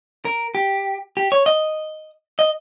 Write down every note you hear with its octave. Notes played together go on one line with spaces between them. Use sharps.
A#4
G4
G4
C#5
D#5
D#5